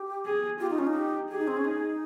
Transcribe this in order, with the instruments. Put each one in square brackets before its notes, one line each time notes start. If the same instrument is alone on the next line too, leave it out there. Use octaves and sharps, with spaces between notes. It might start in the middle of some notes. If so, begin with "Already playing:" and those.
Already playing: [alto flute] G4
[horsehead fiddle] G#4
[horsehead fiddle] F4 [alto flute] G4
[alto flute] D#4
C#4
D#4
[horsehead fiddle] G4
[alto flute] G4 [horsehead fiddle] G#4
[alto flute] D#4
C4
C#4
D#4